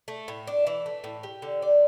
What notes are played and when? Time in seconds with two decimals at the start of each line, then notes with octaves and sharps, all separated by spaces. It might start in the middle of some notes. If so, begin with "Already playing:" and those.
0.08 A3
0.28 A2
0.47 D4
0.67 E3
0.86 A3
1.04 A2
1.23 G4
1.42 D3
1.62 D5